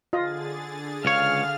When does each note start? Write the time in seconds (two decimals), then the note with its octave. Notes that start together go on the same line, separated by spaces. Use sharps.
0.13 D3 F4 G#4 D#5 A6
1.05 C#2 C#5 F5 F6